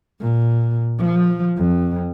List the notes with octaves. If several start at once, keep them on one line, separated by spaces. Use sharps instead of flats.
A#2
F3
F2